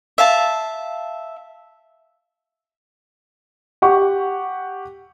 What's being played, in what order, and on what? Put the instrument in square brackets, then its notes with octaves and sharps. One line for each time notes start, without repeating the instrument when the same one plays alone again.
[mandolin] E5 F5 A5
[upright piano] G4 F#5 C#6